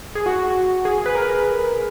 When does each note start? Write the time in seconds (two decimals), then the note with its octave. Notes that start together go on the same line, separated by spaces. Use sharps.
0.15 G#4
0.26 F#4
0.85 G#4
1.06 B4
1.15 A#4